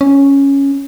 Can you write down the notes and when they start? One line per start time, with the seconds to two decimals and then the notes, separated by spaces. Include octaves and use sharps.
0.01 C#4